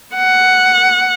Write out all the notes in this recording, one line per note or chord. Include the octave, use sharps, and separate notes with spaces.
F#5